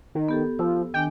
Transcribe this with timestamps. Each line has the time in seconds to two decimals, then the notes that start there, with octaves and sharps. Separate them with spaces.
0.15 D#3
0.29 B3 G4 A4
0.59 F3 E6
0.94 D#3 D4 G5 G#5